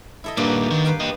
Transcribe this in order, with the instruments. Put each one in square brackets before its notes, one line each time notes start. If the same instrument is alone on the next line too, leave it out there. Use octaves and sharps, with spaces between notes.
[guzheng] E4 A4 D#5
[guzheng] G2 A#3 F#4 [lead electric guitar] A#2 G3
[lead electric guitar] D#3
[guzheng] B4 F5 G5
[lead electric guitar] G4 D#5